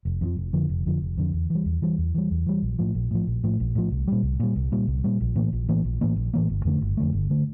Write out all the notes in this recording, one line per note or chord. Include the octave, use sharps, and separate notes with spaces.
F1
F2 D3 F3
F1
F2 D3 F3
F1
F2 D3 F3
F1
F2 D3 F3
E2
E3
G3
E2
E3 G3
E2
E3 G3
E2
E3 G3
A#1
A2 F3
A#1
A2 F3
A#1
A2 F3
A#1
A2 F3
C2
A#2 G3
C2
A#2 G3
C2
A#2 G3
C2
A#2 G3
A#1
A2 E3 A#3
A#1
A2 E3 A#3
A#1
A2 E3 A#3
A#1
A2 E3 A#3
G1
F2 D3 A3
G1
F2 D3 A3
G1
D3 A3